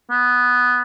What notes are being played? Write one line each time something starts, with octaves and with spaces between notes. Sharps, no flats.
B3